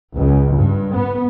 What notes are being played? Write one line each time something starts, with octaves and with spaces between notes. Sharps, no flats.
C#2
G2
B3